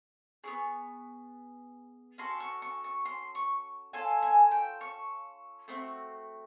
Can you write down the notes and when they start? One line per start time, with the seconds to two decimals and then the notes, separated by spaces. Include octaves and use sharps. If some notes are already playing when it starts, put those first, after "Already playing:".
0.44 B3 E4 G#4 C#6
2.18 C#4 F#4 A4 C6
2.40 C#6
2.62 C#6
2.84 C#6
3.05 C6
3.35 C#6
3.93 C#4 F4 A4 G#5
4.23 G#5
4.51 G5
4.81 C#6
5.68 A3 C4 D#4 F#4